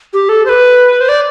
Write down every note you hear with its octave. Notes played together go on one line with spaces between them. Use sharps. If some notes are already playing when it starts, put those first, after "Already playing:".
G4
A4
C5
B4
C5
D5